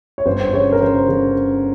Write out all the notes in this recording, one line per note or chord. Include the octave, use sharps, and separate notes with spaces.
C#5
G1 C5
C#3 C#5
A#4
C#3 C5
C#3